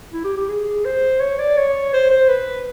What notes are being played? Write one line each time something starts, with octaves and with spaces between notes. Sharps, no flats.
E4
G4
G4
G#4
C5
C#5
D5
C#5
C5
C5
B4